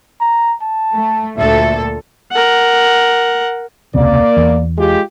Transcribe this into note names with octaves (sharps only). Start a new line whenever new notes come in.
A#5
A5
A3
D2 A#2 A4 E5
A#4 F#5
E1 C#2 C3 A#3 D5
E2
G#3 F4 G4